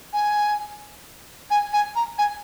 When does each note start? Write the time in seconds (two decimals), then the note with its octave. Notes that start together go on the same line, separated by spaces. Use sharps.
0.13 G#5
1.51 G#5
1.73 G#5
1.96 A#5
2.18 G#5